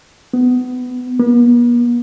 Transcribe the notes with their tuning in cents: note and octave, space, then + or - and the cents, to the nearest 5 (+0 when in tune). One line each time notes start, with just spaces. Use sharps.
B3 +20
B3 -45